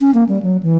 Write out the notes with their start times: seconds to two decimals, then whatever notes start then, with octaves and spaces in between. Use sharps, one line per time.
0.01 C#4
0.14 A#3
0.29 G3
0.43 F#3
0.63 E3